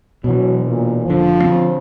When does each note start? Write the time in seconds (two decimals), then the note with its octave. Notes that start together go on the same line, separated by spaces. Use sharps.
0.24 B2 E3 F#3
0.67 A#2
1.06 F1 D3 F3
1.44 D3 C4